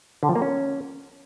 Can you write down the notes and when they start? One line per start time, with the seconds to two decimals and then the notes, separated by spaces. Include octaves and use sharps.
0.23 D3
0.29 F3
0.35 A#3
0.42 C#4